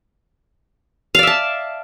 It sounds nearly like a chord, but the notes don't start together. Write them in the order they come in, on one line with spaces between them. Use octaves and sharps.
F5 D5 E5 A5